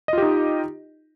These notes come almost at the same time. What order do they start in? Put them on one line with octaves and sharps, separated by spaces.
D#5 F4 G4 D#4